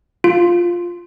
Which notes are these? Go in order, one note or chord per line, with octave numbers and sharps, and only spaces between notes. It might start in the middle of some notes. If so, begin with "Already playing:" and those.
F4